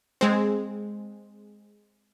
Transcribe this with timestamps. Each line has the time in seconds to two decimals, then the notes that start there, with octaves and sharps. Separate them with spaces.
0.21 G#3 C4